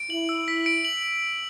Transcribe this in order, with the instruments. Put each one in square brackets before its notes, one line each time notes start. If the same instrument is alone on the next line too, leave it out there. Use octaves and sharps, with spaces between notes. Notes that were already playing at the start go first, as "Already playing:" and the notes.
Already playing: [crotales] D7
[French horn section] E4 [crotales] F#7
[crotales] E6
B6
D7
F#7